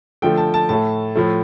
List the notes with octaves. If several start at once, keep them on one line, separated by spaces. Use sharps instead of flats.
D3 F3 A3 G5
A5
A5
A2 A3 A5
A2 F3 A3